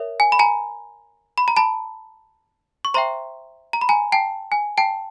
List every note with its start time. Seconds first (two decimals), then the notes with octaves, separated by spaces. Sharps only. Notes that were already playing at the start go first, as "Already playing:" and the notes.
Already playing: A#4 C#5 E5
0.20 G#5
0.32 B5
0.39 G#5 A#5
1.38 B5
1.48 A#5
1.57 A5 B5
2.85 C#6
2.94 C5 E5 G5 A#5 C6
3.73 A#5
3.81 B5
3.89 G#5 A#5
4.12 G5 A5
4.52 G#5
4.77 G5 A5